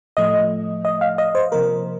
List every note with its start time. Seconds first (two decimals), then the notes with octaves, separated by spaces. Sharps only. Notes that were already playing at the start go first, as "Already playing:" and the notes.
0.17 A2 F3 A3 D#5
0.85 D#5
1.01 F5
1.18 D#5
1.35 C5
1.52 C3 F3 A#3 A#4